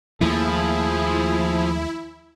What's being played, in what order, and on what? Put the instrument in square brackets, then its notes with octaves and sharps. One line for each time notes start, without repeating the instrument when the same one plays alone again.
[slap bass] D#2 A3 A#3 [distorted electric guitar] F3 [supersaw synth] E4 [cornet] G#4